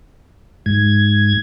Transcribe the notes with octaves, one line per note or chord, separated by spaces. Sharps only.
G#2 G#6